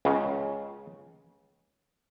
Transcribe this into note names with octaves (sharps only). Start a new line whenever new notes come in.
C#2 C#3